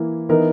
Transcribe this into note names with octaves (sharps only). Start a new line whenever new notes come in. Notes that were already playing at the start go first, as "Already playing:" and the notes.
Already playing: E3 A#3 E4
E3 B3 D#4 A#4